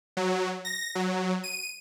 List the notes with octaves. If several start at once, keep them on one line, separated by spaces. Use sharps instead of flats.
F#3
A#6
F#3
D#7